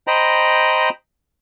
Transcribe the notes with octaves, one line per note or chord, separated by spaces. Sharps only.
C5 D#5 G5 A#5 B5